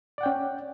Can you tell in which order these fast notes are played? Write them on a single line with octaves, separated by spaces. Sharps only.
D5 F#5 G5 C#4